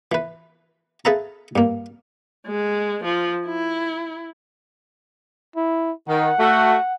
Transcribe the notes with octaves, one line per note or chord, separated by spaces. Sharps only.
E3 B4
G#4 A4 B4 E5 F5 A#5
G2 A#3
G#3
F3
E4
E4
D#3 F#5
A3 F#4